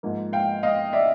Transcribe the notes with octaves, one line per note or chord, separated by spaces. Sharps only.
G#2 F3 A#3
F5 G5
D#5 F5
D5 E5